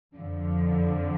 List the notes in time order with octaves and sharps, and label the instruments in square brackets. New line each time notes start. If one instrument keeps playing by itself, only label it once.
[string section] F2 D3 F3